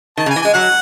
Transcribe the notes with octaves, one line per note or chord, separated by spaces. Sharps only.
D#3 A5
C#3
G#5
E3
G#3 G#5
F#3 F#5